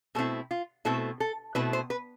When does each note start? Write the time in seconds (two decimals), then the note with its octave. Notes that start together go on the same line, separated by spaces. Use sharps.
0.15 B2 A3 C4 E4 A4
0.51 F4
0.85 B2 A3 C4 E4 A4
1.20 A4
1.55 B2 A3 C4 E4 B4
1.73 C5
1.90 B4